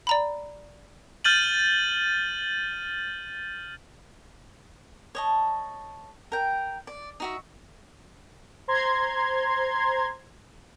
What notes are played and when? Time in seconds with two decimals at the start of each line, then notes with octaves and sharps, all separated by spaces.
0.07 D5 A#5 B5
1.24 F6 G6 A6 D#7 F#7
5.15 C#5 D#5 A5
6.32 A#4 G5
6.87 D5
7.20 D#4 F#4 E5
8.68 C5 A#5 C6 G#6